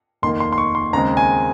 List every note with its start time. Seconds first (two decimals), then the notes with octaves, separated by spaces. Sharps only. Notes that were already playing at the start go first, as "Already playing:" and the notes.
0.22 F1 D#2 D#3 A#3 C6
0.40 C6
0.53 C6
0.58 C#6
0.75 C6
0.93 D#2 C#3 G#3 C4 A#5
1.17 G#5